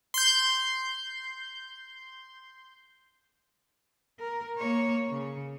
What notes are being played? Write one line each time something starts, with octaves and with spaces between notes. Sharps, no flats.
C6 G6
A#4
A#3 C#5
C#3